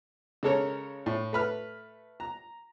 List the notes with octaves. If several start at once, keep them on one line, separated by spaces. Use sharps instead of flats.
C#3 G#3 A4 A#4 C#5
A2
A3 B4 F6
A#5